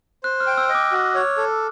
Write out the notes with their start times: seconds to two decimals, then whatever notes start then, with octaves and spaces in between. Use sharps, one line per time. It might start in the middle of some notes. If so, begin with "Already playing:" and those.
0.23 C5 F#6
0.40 F6
0.47 G5
0.57 E6
0.69 D#5
0.75 D6
0.92 F#4
1.14 C#5
1.37 A4